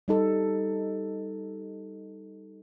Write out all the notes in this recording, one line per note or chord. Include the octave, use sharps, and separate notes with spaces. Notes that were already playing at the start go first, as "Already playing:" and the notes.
G3 D#4 A4